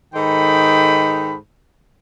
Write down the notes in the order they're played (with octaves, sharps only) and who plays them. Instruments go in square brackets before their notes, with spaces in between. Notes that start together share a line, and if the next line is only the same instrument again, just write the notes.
[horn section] G#2 D#3 D#4 A4 G5 B5